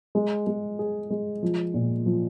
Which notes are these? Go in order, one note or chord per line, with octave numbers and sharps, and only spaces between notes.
G#3
G#3
G#4
G#3
F3
A#2
F3